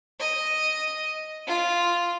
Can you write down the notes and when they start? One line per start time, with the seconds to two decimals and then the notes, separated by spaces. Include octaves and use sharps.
0.20 D#5
1.47 F4